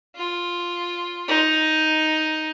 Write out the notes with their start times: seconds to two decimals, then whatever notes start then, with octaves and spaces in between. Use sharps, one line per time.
0.16 F4
1.28 D#4